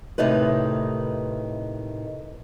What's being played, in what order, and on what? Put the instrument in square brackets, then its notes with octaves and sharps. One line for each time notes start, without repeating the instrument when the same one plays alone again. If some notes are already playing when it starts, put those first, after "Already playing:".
[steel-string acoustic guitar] A2 C3 D#3 D#4 B4